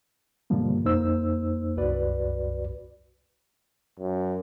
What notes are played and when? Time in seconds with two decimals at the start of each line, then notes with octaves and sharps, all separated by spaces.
0.50 G2 B2 D3 F3 G3 A#3
0.85 F2 A#3 D#4 C5 E6
1.76 C2 F#2 F#4 B4 D5
4.00 F#2